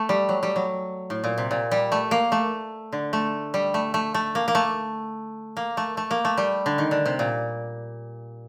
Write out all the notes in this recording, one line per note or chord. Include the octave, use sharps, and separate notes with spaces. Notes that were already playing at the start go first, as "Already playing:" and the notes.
Already playing: A3
G3
F#3
G3
F#3
A2
A#2
C3
A#2
G3
A3
A#3
A3
D3
A3
G3
A3
A3
A3
A#3
A#3
A3
A#3
A3
A3
A#3
A3
G3
D3
D#3
D3
C3
A#2